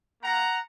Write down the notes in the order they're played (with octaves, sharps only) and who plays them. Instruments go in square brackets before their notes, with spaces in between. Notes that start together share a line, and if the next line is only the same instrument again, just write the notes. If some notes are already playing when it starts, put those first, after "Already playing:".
[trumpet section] A#3 F4 F#5 A#5